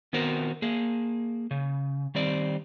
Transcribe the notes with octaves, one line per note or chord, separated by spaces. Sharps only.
D#3 B3 C4 F#4 A#4 C5
A#3 G#4
C#3
D#3 G3 C4 D5